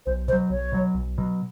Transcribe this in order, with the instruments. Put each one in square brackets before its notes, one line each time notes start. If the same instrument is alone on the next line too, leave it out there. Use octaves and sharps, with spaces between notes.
[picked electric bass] B1 [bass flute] C5
[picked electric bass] B2 [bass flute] C5
[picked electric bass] F#3
[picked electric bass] B1 [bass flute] C#5
[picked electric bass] B2 F#3
B1
B2 F#3